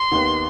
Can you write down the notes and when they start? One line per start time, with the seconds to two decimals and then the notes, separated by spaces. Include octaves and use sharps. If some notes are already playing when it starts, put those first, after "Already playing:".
Already playing: C6
0.12 D#2 D#3 B3